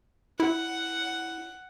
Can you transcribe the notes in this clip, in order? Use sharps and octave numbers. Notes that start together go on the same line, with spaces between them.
E4 F#5